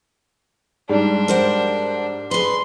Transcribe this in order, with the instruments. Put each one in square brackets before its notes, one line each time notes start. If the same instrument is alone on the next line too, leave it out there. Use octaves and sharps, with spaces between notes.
[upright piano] G#2 G3 [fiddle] D4
[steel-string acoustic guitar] A#4 C5 F#5
[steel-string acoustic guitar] G#4 B4 [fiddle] C6